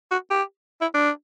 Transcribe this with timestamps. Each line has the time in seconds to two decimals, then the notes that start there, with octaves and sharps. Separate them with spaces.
0.11 F#4
0.30 G4
0.81 E4
0.94 D4